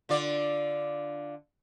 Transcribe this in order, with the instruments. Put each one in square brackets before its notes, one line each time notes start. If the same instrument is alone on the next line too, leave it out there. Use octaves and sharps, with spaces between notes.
[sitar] D3 F4 D5